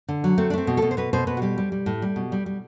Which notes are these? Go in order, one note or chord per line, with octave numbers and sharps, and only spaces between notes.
D3
F#3
A3 C4
D4
A3 C4
B2
B2 A4
C5
B2 B4
B2 C5
B2 B4
F#4
G3 G4
G3
G3
A2
G3
B2
G3
G3